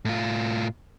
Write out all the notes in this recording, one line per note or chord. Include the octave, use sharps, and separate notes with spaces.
A2 F4